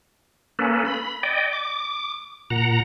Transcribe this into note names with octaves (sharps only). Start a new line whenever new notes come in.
A#3 C#4 A4 B4
B5
D5 D#5 G5
D6
A#2 F#5 A#5